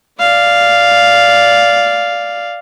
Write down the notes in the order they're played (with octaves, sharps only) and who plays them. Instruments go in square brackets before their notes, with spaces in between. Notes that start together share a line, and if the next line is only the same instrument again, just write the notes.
[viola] D5 F5